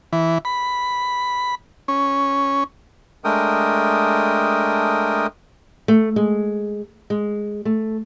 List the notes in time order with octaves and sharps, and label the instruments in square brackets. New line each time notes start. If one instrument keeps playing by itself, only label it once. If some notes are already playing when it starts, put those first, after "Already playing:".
[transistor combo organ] E3
B5
C#4
[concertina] G#3 A3 D4 A#4 G5 D#6
[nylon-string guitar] A3
G#3
G#3
A3